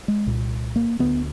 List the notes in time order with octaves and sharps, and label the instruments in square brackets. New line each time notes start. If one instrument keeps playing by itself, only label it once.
[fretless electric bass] G#3
C2 A#2
A#3
D2 D3 B3